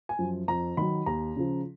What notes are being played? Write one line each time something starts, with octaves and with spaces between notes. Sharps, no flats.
G#5
F#2 F3
F2 A#5
D#3 F#3 B5
D#2 A#5
C#3 F3